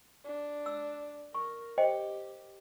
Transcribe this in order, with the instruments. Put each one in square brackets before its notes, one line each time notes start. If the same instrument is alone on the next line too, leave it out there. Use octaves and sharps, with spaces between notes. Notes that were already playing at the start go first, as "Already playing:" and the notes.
[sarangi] D4
[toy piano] E6
[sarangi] A#4 [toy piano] C#6
[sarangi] G4 [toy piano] C5 D#5 G5